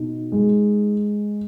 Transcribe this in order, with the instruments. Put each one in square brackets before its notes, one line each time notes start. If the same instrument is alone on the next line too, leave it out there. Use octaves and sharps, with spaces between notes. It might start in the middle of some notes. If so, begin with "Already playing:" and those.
Already playing: [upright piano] B2 D#4
G#3